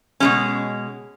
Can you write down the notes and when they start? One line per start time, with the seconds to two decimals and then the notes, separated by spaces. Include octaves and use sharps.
0.20 B2 G#3 C#4